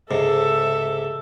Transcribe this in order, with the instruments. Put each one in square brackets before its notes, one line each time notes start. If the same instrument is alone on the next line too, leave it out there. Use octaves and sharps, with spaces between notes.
[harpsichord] C#2 G#2 C3 [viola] A4 E5